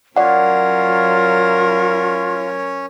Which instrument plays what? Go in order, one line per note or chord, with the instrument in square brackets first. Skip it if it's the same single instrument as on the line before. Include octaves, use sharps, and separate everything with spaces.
[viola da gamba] F#3 A#4 [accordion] C#4 C#5 [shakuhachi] F4 [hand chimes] D5 F#5